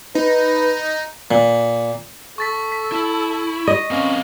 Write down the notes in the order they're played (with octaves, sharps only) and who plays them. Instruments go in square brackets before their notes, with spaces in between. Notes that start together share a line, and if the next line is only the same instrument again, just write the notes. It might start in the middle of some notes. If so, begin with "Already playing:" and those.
[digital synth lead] D#4 [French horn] B4
[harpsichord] A#2
[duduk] A4 [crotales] C#6 A6 B6
[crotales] B6
[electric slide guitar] E4
[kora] D#5
[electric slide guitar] C4 A#4 F5 [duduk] C#4